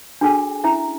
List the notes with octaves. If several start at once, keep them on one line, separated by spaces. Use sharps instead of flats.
D4 F#4 G#4 A4 G5 G#5
C#4 E4 E5 A#5